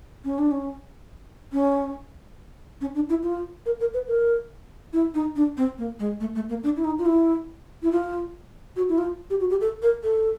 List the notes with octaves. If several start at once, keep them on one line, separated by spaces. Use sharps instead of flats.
C#4
D4
C#4
C#4
C#4
D4
E4
F4
A#4
A#4
B4
A#4
E4
D#4
D4
C4
A#3
G#3
A3
A3
A#3
D4
E4
D#4
F4
E4
E4
F4
F#4
E4
F4
G4
F#4
G4
A4
A#4
A4